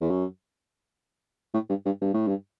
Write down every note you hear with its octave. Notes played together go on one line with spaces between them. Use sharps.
E2
F#2
A2
G2
G2
G2
A2
G2